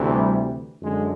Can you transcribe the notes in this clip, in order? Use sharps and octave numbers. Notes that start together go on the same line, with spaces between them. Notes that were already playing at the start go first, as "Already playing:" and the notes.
Already playing: D2 C3 E3
G3
F#2 D3 G#3